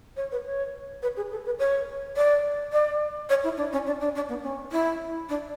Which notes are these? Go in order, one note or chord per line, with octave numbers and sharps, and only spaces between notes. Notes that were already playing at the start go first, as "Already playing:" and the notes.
C#5
B4
C#5
B4
G#4
A4
B4
C#5
D5
D5
C#5
E4
D4
C#4
D4
D4
D4
B3
C#4
E4
D4